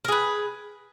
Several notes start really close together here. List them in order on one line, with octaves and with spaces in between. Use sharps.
A#4 G#4 B4